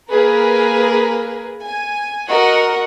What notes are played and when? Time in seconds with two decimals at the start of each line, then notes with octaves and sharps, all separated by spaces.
0.10 A#3 G#4 A#4 B4
1.64 G#5
2.28 F#4 A#4 D#5 F#5